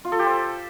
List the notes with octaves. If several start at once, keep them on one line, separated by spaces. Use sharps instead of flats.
F4
A4
G4
C5